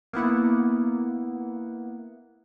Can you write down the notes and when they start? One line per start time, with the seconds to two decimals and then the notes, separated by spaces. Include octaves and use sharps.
0.13 A#3 B3 E4 F#5